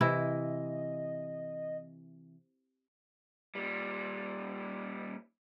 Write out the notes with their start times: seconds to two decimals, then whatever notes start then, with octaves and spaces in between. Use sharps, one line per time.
0.01 C3 E3 E4 D#5
3.55 A#2 G3